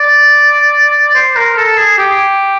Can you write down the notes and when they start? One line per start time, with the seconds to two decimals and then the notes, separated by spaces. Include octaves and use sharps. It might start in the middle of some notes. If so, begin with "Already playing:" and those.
Already playing: D5
1.15 C5
1.36 A#4
1.57 A4
1.77 G#4
1.98 G4